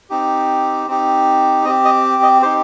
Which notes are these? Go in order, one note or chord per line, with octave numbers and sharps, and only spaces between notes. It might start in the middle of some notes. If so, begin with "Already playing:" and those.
C4 D#4 G4
C4 D#4 G4
C4 G4 D#5
D#5
D#5
C4 D#4 G4 C5